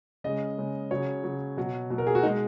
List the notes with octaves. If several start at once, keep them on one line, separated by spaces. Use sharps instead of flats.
C#3 G#3 D#5
C#3 G#3
C#3 F#3 C#5
C#3 F#3
B2 F#3
B2 F#3
A#4
G#4
F#4
B2 G#3 D#4